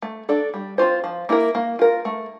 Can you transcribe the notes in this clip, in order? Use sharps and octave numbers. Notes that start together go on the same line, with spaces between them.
A3
D4 A4 D5
G3
C4 F4 C5
F3
A#3 E4 A#4
A#3
F4 A#4
A3